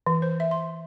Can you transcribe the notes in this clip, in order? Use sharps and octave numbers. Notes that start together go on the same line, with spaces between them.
E3
C5
E5
C6